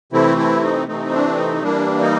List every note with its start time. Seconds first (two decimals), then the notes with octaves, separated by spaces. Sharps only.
0.12 C3 E3 A3 C4 E4
0.37 E4
0.63 D#4
0.88 C3 E3 A3 C4 D#4
1.13 D4
1.37 D#4
1.62 E3 G3 A#3 D4
2.01 D#4